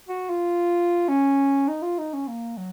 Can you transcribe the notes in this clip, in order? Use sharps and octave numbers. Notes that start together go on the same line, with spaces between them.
F#4
F4
C#4
D#4
F4
D#4
C#4
A#3
F#3